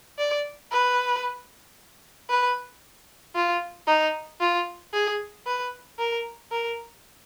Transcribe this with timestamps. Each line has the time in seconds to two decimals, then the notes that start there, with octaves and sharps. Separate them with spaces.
0.18 D5
0.71 B4
2.30 B4
3.35 F4
3.87 D#4
4.40 F4
4.93 G#4
5.46 B4
5.99 A#4
6.51 A#4